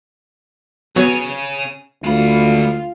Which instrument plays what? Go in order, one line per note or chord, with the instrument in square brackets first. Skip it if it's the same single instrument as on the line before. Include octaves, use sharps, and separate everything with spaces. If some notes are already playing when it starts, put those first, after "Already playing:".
[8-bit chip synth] F#3 B3 C#5 [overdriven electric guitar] C#4 G#4
[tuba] D2 [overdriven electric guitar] G#3 B5 [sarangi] F4